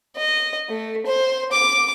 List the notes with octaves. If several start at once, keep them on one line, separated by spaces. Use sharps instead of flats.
D#5
A3
C5
D6